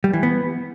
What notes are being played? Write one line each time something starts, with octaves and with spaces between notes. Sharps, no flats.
G3
E3
B3